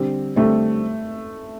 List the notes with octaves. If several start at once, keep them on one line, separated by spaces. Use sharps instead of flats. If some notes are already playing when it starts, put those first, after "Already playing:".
Already playing: D3 G3 C4
D3 G3 A3 C4